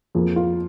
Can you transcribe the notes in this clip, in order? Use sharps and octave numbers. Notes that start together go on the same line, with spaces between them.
F2 F3 A#3 G#4
F4